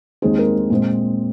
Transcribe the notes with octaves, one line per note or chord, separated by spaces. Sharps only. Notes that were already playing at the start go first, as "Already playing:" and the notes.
D#2 D#3 G#3 C4 G#4
A#4
A#2 G#3 C4